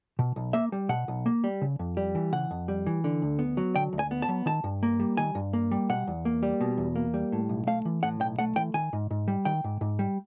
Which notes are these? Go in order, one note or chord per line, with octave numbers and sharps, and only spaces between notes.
B2
B1
A#3 E5
G3
B2 F#5
B1
A#3
G3
C#3
F2
G3
E3
C#3 F#5
F2
G3
E3
D3
D2
B3
F#3
D3 G5
D2
G#5
B3
A5
F#3
D#3 A5
G2
A#3
G3
D#3 G#5
G2
A#3
G3
B2 F#5
E2
A#3
G3
B2
E2
A#3
G3
A2
B1
A3 F5
E3
A2 F#5
B1 G5
A3 F#5
E3 G5
D#3 G#5
G#2
G#2
G3
D#3 G5
G#2
G#2
G3